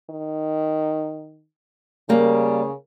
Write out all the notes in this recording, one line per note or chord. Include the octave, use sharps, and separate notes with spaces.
D#3
C#3 G3 A#3